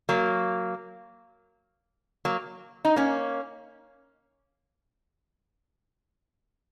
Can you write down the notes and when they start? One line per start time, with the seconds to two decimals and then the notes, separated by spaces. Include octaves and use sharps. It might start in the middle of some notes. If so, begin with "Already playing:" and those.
0.09 F#3 A#3
2.25 F#3 A#3
2.85 D#4
2.96 A#3 C#4